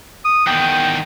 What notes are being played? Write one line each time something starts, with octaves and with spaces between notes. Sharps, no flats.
D#6
E2 D#3 G5